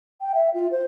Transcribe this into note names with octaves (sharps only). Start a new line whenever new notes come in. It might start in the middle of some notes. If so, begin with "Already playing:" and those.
G5
E5
F4
C5